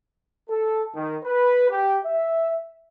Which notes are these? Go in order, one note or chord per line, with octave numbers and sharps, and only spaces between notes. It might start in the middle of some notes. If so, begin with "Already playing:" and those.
A4
D#3
B4
G4
E5